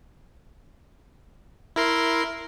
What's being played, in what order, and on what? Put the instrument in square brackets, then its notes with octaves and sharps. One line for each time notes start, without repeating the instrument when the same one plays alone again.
[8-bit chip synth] E4 A#4 C6